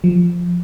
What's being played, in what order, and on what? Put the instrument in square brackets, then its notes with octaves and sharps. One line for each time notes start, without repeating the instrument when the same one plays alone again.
[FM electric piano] F3